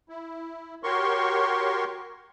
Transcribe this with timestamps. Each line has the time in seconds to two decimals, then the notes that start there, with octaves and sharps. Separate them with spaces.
0.09 E4
0.83 F#4 G4 A#4 C#5 C6 C#6